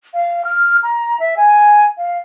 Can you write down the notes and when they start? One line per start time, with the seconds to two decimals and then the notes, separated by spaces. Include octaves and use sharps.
0.14 F5
0.45 F6
0.83 A#5
1.20 E5
1.37 G#5
1.98 F5